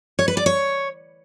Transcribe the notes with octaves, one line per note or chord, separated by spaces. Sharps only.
C#5
B4
D5
C#5